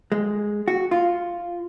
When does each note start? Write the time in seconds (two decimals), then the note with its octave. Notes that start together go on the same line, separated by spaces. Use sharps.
0.12 G#3
0.68 F#4
0.91 F4